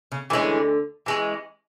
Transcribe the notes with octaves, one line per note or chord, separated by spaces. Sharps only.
C#3
D2 D3 E3 G#3 C#4
E3 G#3 C#4